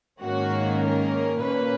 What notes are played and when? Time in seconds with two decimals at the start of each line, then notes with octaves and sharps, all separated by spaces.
0.22 G#2 D#3 A#3 C#4 F#4
0.83 A#4
1.43 A#2 A#3 C#4 B4